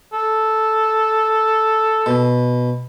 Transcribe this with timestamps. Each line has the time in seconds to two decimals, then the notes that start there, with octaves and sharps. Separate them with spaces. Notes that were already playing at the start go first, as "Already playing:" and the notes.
0.13 A4
2.06 B2